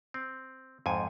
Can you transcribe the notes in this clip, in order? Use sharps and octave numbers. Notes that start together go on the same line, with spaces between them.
C4
F2 G#2 G#5